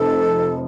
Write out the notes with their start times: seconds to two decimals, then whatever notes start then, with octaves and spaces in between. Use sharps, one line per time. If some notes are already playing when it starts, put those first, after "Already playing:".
Already playing: F1 F2 C3 F3 A4